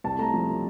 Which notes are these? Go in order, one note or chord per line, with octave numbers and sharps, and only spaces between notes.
C2 A5
A3 A#5
F3
C3